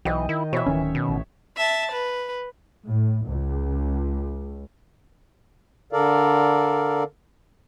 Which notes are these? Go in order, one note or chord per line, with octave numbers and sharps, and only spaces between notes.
B1 E3 D#5 G5
D#3 E4
B2 E3 C#5 E5
D1 D#3 C#4
B2
A1
E5 A5
B4
A2
C#2
D3 A4 A#4 D5 F5